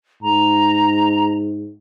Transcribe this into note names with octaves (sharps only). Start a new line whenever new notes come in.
G#2 A#5